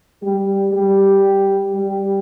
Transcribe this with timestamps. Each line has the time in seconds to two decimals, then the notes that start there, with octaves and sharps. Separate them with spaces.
0.22 G3 G4
0.73 G3 G4
1.74 G3 G4